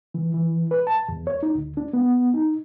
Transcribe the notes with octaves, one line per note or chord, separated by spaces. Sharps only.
E3
E3
B4
A5
E2
C#5
D#4
D2
D4
B3
D#4